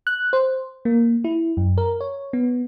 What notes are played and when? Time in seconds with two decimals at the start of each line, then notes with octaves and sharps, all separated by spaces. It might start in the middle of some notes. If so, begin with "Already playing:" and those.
0.07 F#6
0.33 C5
0.85 A#3
1.24 E4
1.57 F#2
1.78 A#4
2.01 C#5
2.33 B3